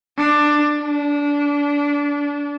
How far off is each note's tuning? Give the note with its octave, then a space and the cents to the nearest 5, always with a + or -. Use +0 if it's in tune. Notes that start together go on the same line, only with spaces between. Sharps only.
D4 +15
D4 -25